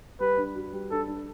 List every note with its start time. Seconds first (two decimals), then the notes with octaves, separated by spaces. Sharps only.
0.20 G3 B4
0.37 D4
0.55 F#4
0.72 G3
0.91 D4 A4
1.08 D4